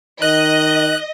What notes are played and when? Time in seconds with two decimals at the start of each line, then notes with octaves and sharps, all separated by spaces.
0.22 D#3 D#5 F#6